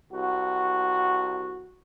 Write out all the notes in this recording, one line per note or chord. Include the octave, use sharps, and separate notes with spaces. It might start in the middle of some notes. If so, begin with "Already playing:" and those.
C2 F#4